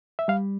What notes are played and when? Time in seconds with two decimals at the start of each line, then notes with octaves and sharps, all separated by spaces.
0.19 E5
0.28 G3 F5